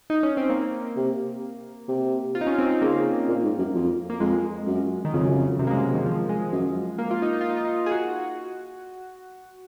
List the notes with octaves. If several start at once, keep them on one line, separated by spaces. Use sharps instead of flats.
D#4
C#4
C4
A#3
C3
C3
F4
D#4
C#4
C4
C4
C#3 A#3
A#2
G#2
F#2
F2
A#3
F2 G#3
F#2
D#3
F2 C#3
F#2
F2 C#3
F#2 C3
A#3
G#3
D#3
F3
G#3
F#2
A#3
F4
D#4
D#4
F4
D#4
F4
D#4
G#4
F#4